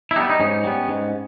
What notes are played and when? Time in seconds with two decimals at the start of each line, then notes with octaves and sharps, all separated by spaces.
0.11 E4
0.16 G3 D#4
0.20 B3
0.30 D#4
0.40 G#2 C#4
0.64 G3 B3
0.88 G#2